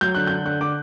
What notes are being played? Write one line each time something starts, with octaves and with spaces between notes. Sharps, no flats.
F#3 G6
D3 F#6
D3 G6
D3 F#6
D3 D6